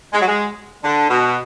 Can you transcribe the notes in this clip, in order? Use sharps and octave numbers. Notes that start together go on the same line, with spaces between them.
G#3
F#3
G#3
D3
B2